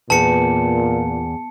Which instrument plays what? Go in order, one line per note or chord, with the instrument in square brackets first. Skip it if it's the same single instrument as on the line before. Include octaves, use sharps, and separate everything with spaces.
[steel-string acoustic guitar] E2 [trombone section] A#2 [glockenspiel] A5 C#7